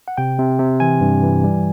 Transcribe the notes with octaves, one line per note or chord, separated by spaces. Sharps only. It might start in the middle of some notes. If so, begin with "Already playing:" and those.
F#5
C3 G5
C3
C3
E3 G#5
G2
E3
G3